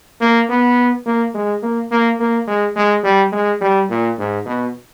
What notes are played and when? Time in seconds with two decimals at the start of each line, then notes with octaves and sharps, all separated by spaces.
0.21 A#3
0.49 B3
1.06 A#3
1.34 G#3
1.63 A#3
1.91 A#3
2.20 A#3
2.48 G#3
2.76 G#3
3.04 G3
3.32 G#3
3.61 G3
3.90 A#2
4.18 G#2
4.46 B2